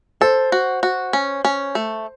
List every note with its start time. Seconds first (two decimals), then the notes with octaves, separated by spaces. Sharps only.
0.21 A4 C5
0.52 F#4
0.83 F#4
1.13 C#4
1.45 C#4
1.75 A3